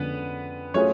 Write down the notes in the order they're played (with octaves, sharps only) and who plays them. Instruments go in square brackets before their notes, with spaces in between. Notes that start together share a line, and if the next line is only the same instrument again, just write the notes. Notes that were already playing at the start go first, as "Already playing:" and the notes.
Already playing: [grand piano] F2 D3 G#3 C#4 [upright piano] B3 B4
[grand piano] F#3 A3 F4 G#4 [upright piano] C#4 C#5